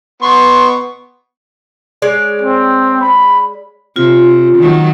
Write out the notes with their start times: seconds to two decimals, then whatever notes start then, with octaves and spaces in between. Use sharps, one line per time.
0.22 B3 C6 C#6
2.02 G#3 C#5 D5
2.42 C4
3.01 B5
3.96 C3 F4
4.58 D#3 F#3